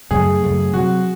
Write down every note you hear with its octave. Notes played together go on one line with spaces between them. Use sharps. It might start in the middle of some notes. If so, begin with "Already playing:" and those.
F#2 C#3 F#3 A3 G#4
F#2 C#3 F#3 A3
C3 F#3 C4 F#4